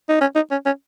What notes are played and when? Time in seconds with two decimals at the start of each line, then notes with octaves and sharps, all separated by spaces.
0.09 D#4
0.21 C#4
0.35 D#4
0.51 C#4
0.66 C#4